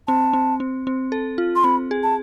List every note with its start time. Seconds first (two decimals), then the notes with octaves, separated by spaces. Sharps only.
0.08 C4 A5
0.33 C4
0.60 C4
0.87 C4
1.12 A4
1.38 F4
1.56 C6
1.64 C4 B5
1.91 G#4
2.03 A5